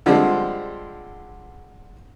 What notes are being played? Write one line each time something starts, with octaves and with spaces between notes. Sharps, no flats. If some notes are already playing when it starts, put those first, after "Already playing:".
D3 F3 G3 G#3 C4 D4